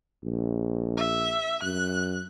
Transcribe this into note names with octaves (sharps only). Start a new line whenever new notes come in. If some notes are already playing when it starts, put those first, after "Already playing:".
A#1
E5
F#2 F#6